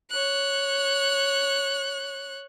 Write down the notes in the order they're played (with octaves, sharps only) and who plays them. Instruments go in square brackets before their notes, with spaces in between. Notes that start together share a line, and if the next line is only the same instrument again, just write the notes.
[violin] C#5 F#6